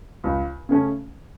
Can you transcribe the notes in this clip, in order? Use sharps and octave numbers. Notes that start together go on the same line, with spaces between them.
C#2
C#3 A3 C#4